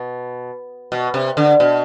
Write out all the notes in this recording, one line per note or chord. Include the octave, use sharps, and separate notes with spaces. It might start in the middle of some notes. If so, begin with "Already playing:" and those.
Already playing: B2
B2
C3
D3
B2